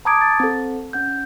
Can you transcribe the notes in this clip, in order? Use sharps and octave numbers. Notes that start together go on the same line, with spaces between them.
A5 A#5 D6 D#6 G#6 D7
A6
C4 A4
C#4 F#5 G6